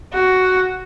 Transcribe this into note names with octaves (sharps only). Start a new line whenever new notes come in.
F#4